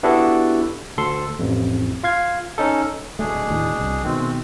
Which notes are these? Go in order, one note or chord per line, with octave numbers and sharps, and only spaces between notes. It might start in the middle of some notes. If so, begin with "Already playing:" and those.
B3 D4 E4 F#4 G4 A4
D2 A4 C6
A1 F2
F4 F5 G#6
C#4 D#4 A4
D1 B2 A3 D4 G#4
D#2 A2 D3
C2
B2 D#3 G#3 A3 C4